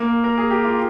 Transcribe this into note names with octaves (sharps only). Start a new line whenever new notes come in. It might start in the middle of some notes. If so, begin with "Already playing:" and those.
Already playing: A#3
A#4
G#4
G4
F4